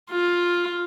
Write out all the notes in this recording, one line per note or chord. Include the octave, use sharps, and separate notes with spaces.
F4